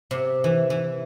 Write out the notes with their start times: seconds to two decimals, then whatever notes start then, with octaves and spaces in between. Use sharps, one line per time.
0.11 C3
0.44 E3
0.70 E3